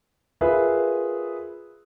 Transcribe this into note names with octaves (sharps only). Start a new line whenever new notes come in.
F4 G#4 A#4 B4 E5